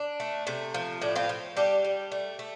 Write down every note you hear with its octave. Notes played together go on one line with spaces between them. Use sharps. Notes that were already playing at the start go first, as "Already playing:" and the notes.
Already playing: D4
A3
C3 A3
F3
A2 A3 D4
C4 F4
F3 C4
G3 D4 G4
G3
A3
A3